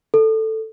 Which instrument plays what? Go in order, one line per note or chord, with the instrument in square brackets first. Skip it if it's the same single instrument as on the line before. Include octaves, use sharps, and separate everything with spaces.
[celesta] A4